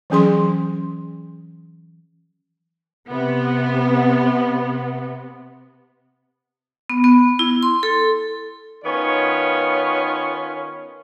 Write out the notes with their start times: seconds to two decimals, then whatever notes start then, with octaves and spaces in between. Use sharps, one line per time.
0.10 E3 F#3 C#4 G#4 C6
3.09 C3 B3
6.90 B3
7.04 B3
7.39 E4
7.63 C6
7.83 A4
8.85 D#3 B3 C#4 F4 C#5